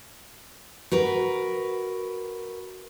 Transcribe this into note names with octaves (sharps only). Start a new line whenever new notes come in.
F#4 A#4 B4